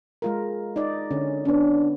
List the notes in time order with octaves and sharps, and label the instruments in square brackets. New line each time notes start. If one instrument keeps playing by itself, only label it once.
[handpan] G#3 F4 A#4
D#4 D5
D3 C#4
[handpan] B3 C#4 [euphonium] D4